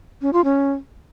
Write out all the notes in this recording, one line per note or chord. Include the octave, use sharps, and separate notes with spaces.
C#4
F4
C#4